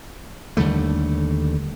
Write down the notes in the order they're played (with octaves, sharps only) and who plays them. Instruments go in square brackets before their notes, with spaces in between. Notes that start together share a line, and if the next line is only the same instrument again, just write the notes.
[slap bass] D#2 D3 G3 A3